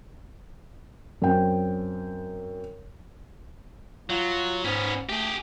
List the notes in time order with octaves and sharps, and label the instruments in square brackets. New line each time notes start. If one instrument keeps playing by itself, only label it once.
[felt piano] F#2 C4 G5
[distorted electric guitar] F#3 [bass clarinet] F4
[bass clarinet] G#2 [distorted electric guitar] B3 C#4
[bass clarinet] A3 [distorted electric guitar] G4 G#4